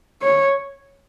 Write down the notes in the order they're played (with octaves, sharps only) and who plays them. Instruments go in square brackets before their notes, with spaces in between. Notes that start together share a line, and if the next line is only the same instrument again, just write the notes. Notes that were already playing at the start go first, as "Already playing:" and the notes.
[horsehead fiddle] C#5